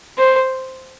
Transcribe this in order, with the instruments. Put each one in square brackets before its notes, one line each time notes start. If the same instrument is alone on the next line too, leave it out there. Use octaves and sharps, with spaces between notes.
[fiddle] C5